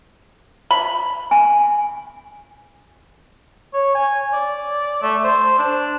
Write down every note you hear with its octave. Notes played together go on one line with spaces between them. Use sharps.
B5
G#5
C#5
G#5
D5
A3
C5
D4